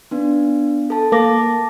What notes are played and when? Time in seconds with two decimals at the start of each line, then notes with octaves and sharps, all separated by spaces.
0.11 B3 D4
0.90 A4 A5
1.12 A#3 A5 D6 A#6